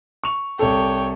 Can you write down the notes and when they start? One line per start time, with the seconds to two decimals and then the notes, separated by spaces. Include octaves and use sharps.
0.24 C#6 F7
0.59 C2 A4 C#5 G5